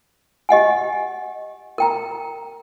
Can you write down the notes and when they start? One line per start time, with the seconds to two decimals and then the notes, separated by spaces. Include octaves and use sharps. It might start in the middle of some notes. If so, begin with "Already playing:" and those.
0.49 G4 D#5 F#5 G#5
1.78 A#4 G5 A#5